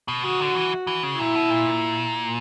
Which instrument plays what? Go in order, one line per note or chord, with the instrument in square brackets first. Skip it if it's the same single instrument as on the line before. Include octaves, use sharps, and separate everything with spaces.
[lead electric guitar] B2
[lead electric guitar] C#3 [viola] F#4
[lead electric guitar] D3
E3
E3
C#3
[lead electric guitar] A#2 [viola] E4
[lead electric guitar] B2
A#2